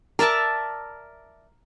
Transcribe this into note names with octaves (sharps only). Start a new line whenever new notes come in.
A#4 D5 E5 A5